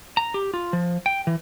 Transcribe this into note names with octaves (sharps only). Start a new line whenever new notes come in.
A#5
G4
F4
F3
G5
E3